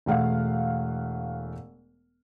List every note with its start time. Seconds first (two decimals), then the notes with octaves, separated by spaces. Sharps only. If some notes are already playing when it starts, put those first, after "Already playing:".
0.06 E1 A3 F5 F#5